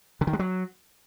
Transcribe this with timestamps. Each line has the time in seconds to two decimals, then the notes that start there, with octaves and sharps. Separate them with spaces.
0.21 D3
0.27 D#3
0.33 G#3
0.39 F#3